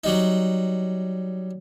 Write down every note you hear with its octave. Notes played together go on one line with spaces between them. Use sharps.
F#3 G3 D#4